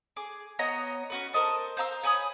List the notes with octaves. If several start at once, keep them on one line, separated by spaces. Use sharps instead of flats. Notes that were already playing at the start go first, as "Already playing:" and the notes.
G#4 D6
B3 C#5 D#5 A#5
C#4 F#4 B4
A#4 C5 D#5 A5
C5 F5 A#5 E6
C#5 G#5 B5 D#6